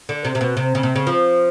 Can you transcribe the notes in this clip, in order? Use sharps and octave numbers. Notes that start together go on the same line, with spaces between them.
D3
C3
C3
B2
C3
C#3
C3
C#3
F3